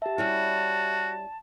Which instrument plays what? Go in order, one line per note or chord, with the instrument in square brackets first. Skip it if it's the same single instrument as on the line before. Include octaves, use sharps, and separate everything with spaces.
[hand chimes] G4 E5 [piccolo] A5
[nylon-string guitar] G3 C#4 E4 [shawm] F#4